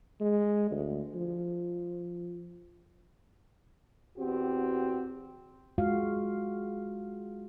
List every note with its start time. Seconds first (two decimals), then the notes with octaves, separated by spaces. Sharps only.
0.21 G#3
0.71 D2
1.15 F3
4.17 E2 C4 F#4 G4
5.78 G#3 F4 F#4 F5